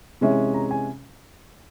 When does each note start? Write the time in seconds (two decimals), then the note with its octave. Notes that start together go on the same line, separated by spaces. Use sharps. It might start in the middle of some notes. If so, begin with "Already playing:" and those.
0.21 C3 E3 G#3 C#4 E4
0.54 A#5
0.71 G#5